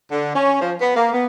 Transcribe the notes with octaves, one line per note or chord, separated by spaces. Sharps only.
D3
C#4
F3
B3
A#3
B3